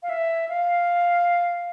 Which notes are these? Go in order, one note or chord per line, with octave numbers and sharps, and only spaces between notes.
F5
E5
F5